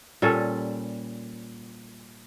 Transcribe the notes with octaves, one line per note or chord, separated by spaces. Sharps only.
A#2 G3 C#4 A4